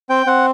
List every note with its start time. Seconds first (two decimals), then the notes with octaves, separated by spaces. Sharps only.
0.09 C4 G5
0.26 C4 F#5